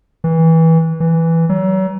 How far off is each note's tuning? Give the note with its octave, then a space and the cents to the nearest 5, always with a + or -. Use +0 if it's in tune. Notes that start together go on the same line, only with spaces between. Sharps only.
E3 -20
E3 +0
F#3 +40